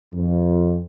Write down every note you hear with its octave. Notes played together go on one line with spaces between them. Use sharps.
F2